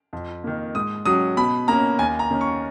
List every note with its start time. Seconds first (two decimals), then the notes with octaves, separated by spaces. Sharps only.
0.13 F2
0.44 D#3 A#3
0.75 G#2 D#6
1.06 F#3 C#4 D#6
1.37 B2 B5
1.68 A#3 C#4 A#5
1.99 D#2 G#5
2.19 A#5
2.30 D#3 A#3 C#4
2.41 C#6